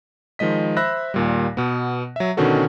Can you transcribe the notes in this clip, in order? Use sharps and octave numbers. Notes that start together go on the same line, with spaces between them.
D#3 F3 G#3 D#5 B6
C5 E5 B5 E6 F#6 A#6
D#2 A#2 G3
B2 B3
F#3 E5
B2 D3 D#3 C#4 F#4 A4